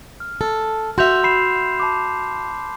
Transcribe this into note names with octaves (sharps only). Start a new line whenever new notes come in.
F6
A4
F#4 E5 C6 G6 F7
B5 C7 E7
A5 B5 D6